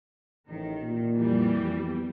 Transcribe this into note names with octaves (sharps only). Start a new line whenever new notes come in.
A1 D#3
A#2
F2 E3 G3
B3